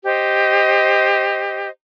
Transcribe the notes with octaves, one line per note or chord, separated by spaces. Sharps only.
G4 C5 D#5